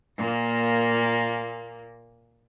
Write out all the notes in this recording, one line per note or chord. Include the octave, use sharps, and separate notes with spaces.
A#2 A#3